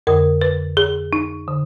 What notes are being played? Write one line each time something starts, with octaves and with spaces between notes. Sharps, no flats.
F2 D3 A#4
B4
G#4
D#4
D3